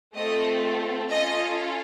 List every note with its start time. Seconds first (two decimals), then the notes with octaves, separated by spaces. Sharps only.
0.15 A3 C4 F4 A4 D#5
1.10 C#4 F4 A4 D#5